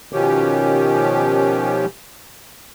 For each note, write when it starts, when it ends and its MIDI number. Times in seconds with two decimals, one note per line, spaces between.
0.13 1.85 47
0.13 1.85 51
0.13 1.85 53
0.13 1.85 61
0.13 1.85 67